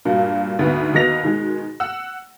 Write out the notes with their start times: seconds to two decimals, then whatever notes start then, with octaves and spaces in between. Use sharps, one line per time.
0.05 G2 A#2 F#3 A#3
0.59 D2 G#2 B3
0.94 D#2 F#3 B3 D#5 A#6 F7
1.23 B2 D#3 G#3
1.80 F#5 E6